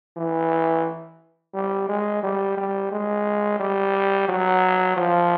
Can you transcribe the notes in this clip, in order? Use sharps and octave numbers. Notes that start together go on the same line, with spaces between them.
E3
G3
G#3
G3
G3
G#3
G3
F#3
F3